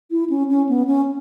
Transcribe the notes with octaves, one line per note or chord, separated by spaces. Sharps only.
E4
C#4
C#4
B3
C#4